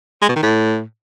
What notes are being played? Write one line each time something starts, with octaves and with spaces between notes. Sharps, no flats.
G#3
B2
D#3
A2